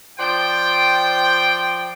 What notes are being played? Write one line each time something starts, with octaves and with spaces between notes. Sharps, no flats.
F3 C5 D5 G5